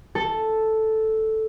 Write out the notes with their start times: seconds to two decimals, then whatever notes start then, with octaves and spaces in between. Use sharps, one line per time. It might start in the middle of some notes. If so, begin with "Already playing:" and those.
0.15 A4